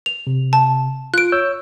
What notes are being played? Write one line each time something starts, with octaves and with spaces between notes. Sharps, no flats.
F7
C3
A5
F4 F#6 D7
C#5 E6 G6